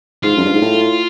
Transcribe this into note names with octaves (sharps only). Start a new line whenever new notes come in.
G#2 F4
F#2
G2
G#2
A2